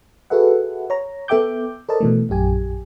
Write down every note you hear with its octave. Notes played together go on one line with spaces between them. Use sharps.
F#4 G#4 A4 B4 E5 F#5
C#5 A#5
B3 A4 E5 G5 D6 G6
A4 A#4 C5 D5 D#5 A5
B2 E3 A3
A#1 F#2 G4 G#5